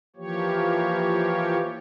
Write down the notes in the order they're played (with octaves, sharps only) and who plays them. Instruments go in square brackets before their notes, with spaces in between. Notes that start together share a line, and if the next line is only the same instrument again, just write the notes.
[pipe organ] E3 F3 A#3 G4 C#5